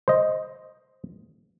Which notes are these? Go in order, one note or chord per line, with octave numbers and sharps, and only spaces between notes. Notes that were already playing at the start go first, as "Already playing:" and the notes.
C5 D#5